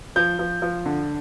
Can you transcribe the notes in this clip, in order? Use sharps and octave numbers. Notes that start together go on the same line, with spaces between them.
F3 G6
F3
F3
D3